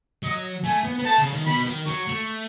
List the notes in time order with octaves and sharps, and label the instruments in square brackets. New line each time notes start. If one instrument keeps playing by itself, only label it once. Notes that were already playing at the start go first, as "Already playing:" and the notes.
[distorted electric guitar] F#3 [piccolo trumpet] D#5
[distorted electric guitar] A3 [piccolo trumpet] G#5
[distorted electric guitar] B3
B3
[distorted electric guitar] A3 [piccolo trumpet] A5
[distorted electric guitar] C#3
D#3
[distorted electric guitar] B2 [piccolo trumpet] B5
[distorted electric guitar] D#3
[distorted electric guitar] F#3 [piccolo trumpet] C#6
[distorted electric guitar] A3